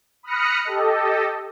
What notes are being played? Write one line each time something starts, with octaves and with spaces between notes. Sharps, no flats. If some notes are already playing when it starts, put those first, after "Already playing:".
B5 D#6 F6 F#6 A#6 C#7
G4 A4 D#5